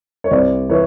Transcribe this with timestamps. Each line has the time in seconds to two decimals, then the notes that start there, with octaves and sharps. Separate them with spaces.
0.24 C#5
0.31 C2 C5 D5
0.69 E3 B4 C#5